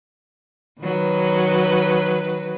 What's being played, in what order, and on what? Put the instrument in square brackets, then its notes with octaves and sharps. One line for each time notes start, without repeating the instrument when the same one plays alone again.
[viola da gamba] D#3 F#3 B4